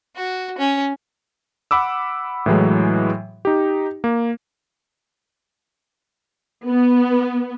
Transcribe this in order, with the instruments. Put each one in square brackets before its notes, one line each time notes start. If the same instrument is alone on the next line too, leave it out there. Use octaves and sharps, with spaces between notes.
[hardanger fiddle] F#4
C#4
[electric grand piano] F#5 B5 D6 E6
A2 E3 F#3 G#3
D#4 G4
A#3
[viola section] B3